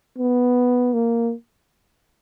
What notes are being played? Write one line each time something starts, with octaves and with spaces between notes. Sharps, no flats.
B3
A#3